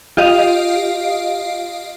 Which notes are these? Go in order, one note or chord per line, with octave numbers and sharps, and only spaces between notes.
F4 G4 D#5 F5